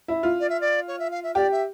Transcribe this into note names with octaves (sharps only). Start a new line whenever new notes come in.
E4
F4
D5
E5
D5
C#5
E5
F5
E5
G4 D5
E5